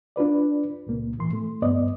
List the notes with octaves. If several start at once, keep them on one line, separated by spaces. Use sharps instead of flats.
D4 F4 B4 D5
C#2 A#2 A#3
A2 E3 C6
A3
D2 G2 B3 D5 D#5